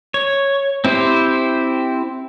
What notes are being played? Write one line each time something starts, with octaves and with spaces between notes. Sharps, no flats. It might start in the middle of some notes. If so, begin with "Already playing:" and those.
C#5
C4 E4 G4 C5